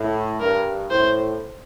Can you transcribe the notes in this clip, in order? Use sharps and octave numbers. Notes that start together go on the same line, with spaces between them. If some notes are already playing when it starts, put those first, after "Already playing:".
Already playing: A2
G2 A#4
A2 C5